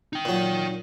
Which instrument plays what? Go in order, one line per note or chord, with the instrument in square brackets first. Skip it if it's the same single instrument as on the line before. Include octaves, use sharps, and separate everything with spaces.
[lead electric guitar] D#4 G5
[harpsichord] A#2 F#3